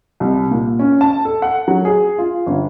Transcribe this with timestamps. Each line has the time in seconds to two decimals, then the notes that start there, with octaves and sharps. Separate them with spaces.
0.20 C2
0.51 A#2
0.79 C#4
1.01 A5
1.25 A4
1.42 F#5
1.68 F#3
1.85 G#4
2.18 F4
2.46 G1